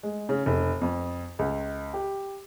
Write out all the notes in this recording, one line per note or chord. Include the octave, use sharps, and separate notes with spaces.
G#3
C#3
F1
F2
C#2
G4